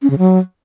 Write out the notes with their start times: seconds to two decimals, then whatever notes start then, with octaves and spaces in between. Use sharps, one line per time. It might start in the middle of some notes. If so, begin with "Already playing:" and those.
0.02 C#4
0.10 C#3
0.18 F#3